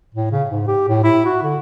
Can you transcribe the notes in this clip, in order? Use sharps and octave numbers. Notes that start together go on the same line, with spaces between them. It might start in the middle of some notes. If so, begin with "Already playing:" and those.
A2
C#3
G#2
G4
A2
E4
F#4
D3